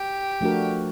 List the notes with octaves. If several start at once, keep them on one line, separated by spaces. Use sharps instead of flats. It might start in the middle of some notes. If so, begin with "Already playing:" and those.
Already playing: G4
F3 A3 D4 F#4 A#4